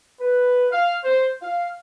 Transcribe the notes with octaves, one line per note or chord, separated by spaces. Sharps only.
B4
F5
C5
F5